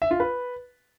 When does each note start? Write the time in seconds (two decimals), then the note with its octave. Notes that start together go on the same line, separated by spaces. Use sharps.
0.02 E5
0.11 F4
0.20 B4